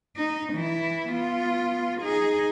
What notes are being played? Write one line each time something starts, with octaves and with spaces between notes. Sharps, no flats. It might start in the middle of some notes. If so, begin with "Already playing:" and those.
D#4
E3 E4
B3 F4
D#4 G#4